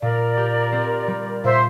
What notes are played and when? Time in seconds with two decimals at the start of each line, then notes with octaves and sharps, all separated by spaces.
0.01 A#2 A#4 D5
0.37 G4
0.72 C4
1.08 G3
1.44 A#2 C5 E5